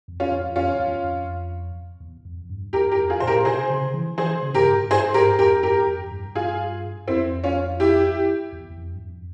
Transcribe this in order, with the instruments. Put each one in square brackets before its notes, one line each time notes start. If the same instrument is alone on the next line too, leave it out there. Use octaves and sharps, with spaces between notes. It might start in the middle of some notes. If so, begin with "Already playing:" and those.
[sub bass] F2
[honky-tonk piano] C#4 F4
[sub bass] F2
[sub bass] F2 [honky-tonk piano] C#4 F4
[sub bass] F2
E2
F2
E2
F2
G2
[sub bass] E2 [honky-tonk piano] G4 A#4
[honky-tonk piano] G4 A#4
[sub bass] F2
[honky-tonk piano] F4 G#4
[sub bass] A#2 [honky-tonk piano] C5
[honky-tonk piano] G4 A#4
[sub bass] A#2
[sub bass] C3 [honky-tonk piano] G#4 C5
[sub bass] C#3
E3
[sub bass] E3 [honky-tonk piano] G#4 C5
[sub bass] C#3
[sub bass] G2 [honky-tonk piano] G4 A#4
[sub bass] G#2
G#2
[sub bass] G2 [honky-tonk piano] G#4 C5
[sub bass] G#2 [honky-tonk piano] G4 A#4
[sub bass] F2 [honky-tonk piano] G4 A#4
[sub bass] G2 [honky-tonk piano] G4 A#4
[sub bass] F2
G2
[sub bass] G2 [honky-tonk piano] F4 G#4
[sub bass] F2 [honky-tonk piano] C4 E4
[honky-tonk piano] C#4 F4
E4 G4
[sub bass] E2
E2
F2
G2
F2